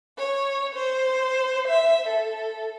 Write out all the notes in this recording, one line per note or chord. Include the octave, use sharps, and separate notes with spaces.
C#5
C5
E5
A4